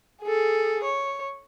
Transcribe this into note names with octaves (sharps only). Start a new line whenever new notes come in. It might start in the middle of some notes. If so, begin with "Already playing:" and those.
G#4 A4
C#5